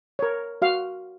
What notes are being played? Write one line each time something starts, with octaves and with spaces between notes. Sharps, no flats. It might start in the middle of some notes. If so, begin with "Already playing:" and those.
A#4 C#5
F#4 F5